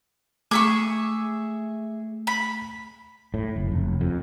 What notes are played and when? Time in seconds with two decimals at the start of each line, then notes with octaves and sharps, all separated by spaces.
0.51 A3 G#4 E5 C#6 D6
2.27 B5
3.34 A2
3.56 F#1
3.72 F1
4.01 F2